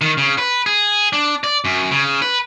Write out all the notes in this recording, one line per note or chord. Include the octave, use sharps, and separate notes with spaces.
D#3
C#3
B4
G#4
D4
D5
F#2
C#3
B4